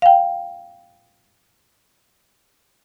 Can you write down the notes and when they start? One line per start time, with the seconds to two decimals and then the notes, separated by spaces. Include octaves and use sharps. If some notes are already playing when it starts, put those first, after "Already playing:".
0.02 F5 G5